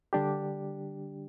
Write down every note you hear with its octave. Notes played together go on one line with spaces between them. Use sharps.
D3 G3 D4 G4